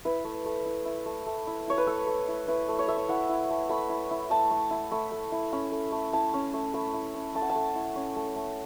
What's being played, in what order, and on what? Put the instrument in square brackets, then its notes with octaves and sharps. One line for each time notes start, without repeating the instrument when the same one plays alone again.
[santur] E4 B4
A3
A3
E4
E4
A3
A3
E4
E4 C#5
B4
A3 A4
A3
E4
E4 B4
A3
C#5
A3 E5
C#5
E4 F#5
E4
A3
A3 B5
E4
E4
A3 A5
A3
E4
A3 B5
A3
E4
C#4 B5
A3
A3
E4 A5
C#4
A3
A3 B5
E4
C#4
A3 A5
F#5
A5
A3
E4
C#4
A3
A3